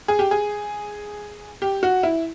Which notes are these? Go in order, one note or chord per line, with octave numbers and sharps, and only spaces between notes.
G#4
G4
G#4
G4
F#4
E4